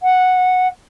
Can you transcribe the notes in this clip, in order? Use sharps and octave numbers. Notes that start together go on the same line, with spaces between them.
F#5